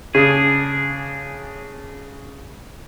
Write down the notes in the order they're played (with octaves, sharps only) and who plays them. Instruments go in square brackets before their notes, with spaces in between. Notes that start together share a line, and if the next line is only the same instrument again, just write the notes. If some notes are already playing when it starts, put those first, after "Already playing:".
[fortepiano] C#3 [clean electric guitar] D4 G#4